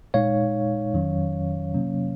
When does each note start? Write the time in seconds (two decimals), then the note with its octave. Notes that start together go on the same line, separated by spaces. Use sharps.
0.14 A#2 G#3 D#4 C#5 F5
0.93 F2 D#3 F#3 C#4
1.74 C3 F#3 A#3 C#4